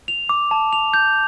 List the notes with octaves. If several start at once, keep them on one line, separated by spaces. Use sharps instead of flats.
F7
D6
A5
F7
G6